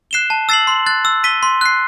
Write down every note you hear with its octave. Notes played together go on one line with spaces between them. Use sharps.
F#6 C7 E7 G7
A5
E6 A6 C7 F#7
C6
F#6 A6
E6
B6 D#7 G7
C6
F#6 C7